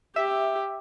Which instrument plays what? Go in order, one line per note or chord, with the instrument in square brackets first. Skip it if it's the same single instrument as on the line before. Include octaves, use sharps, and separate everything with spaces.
[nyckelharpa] G4 [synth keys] E5